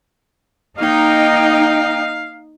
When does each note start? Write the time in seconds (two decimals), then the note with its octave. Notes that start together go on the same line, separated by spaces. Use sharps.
0.78 A#3 D#4 F5 G5